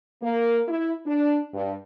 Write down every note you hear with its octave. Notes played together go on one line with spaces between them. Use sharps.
A#3
E4
D4
G2